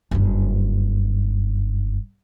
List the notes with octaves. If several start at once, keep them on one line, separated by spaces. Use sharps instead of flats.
F#1 G2